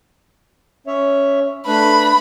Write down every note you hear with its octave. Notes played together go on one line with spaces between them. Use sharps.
C#4 C#5 E5
A3 D4 B4 B5